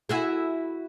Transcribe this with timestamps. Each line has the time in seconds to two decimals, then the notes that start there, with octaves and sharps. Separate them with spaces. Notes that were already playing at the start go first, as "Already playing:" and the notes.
0.09 E4 F#4 G#4